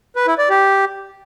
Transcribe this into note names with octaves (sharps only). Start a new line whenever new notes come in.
B4
E4
D5
G4